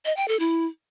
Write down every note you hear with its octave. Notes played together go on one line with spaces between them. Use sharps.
D#5
G5
A4
E4